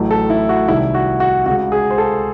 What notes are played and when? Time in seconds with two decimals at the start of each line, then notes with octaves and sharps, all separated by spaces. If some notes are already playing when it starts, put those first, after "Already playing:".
Already playing: A1 A2 F#3 A3
0.11 A4
0.30 E4
0.49 F#4
0.68 C2 C3 D#3 E4
0.95 F#4
1.20 F#4
1.46 C#2 C#3 G#3 F#4
1.72 G#4
1.91 C5
1.98 A4